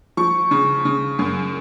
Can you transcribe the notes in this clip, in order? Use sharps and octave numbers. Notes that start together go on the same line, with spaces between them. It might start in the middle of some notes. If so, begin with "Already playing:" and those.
F3 C#6
C#3
C#3
F#2